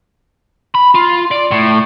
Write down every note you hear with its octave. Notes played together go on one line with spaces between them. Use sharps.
B5
F4
D5
A2